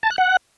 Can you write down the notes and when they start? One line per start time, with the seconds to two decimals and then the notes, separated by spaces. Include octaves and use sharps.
0.03 A5
0.10 F#6
0.18 F#5